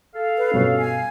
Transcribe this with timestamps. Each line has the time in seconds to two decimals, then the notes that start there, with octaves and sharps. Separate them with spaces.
0.15 A4 F5
0.38 B4
0.54 G2 B2 C#4
0.78 G#5